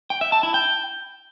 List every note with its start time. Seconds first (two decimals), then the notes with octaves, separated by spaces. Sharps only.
0.10 G5
0.21 E5
0.32 A5
0.43 E4
0.54 G5